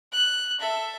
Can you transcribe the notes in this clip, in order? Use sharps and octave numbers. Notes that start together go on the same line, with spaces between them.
F#6
A4 E5